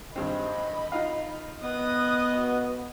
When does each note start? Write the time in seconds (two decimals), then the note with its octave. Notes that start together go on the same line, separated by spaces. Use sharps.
0.16 G#1 G2 C4 D#5 B5
0.92 D#4 F4 F5
1.63 B3 D#5 D#6 F#6
2.36 F#4 B4